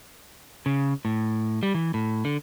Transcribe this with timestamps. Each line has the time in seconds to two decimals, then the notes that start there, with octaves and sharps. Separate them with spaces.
0.66 C#3
1.05 A2
1.63 G3
1.74 E3
1.94 A2
2.25 D3